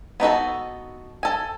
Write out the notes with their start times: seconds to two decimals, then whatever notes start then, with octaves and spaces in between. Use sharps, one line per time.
0.20 B3 D#4 F#4 A4
1.23 A4 G#5